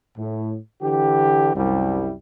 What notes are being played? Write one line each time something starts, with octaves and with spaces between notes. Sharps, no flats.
A2
D3 E3 G4
C2 F#2 G3 E4